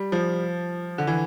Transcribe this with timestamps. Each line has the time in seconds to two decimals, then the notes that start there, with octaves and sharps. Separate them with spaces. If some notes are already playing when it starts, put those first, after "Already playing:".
Already playing: G3
0.12 F3
0.98 D3
1.07 E3